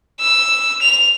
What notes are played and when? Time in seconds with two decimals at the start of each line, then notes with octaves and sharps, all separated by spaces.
0.20 E6
0.82 F7